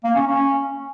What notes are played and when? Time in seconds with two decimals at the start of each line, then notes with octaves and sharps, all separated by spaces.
0.04 A#3
0.15 C#4
0.27 C#4